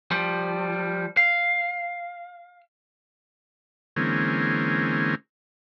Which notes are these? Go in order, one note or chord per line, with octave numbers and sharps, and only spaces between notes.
F3 G3
F5
D3 E3 G#3 A#3 C4 C#4